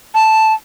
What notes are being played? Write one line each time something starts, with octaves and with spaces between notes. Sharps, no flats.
A5